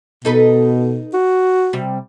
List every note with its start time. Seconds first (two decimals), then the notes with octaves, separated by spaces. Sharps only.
0.25 B2 D#4 A4 B4
1.14 F#4
1.73 C3 G3